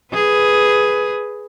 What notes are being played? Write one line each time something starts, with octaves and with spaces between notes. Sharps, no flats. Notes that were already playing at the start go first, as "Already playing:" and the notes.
G#4 B4